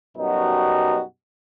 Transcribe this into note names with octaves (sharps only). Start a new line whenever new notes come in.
F#2 B2 G3 D#4 F#4